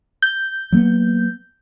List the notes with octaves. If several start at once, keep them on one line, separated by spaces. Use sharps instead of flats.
G6
F#3 A#3 B3